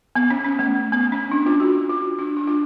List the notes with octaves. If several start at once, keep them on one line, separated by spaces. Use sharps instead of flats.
B3
C#4
C#4
A3
B3
C#4
D4
F4
F#4
F4
D4
D4
F4